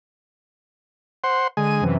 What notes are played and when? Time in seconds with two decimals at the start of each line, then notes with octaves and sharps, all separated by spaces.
1.24 C5 F#5 C6
1.57 D3 G#3 G#5 D#7
1.81 F#2 C3 E3